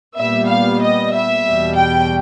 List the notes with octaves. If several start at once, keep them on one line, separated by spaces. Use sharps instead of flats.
A#2 G3 B3 E5
F5
D#5
E5
E2 B2 G3
G5